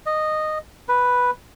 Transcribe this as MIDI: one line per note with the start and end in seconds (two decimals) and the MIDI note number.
0.06 0.58 75
0.89 1.31 71